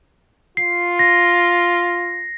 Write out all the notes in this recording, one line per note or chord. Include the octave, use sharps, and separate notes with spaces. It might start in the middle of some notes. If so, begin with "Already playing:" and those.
F4 C7
A#6